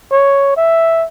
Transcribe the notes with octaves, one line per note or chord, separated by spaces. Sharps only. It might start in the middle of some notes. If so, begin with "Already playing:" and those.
C#5
E5